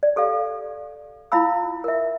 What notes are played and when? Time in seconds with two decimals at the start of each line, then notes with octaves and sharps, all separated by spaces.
0.03 D5
0.16 G4 A4 D5 F5
1.32 E4 F4 F5 B5 E6
1.84 A#4 E5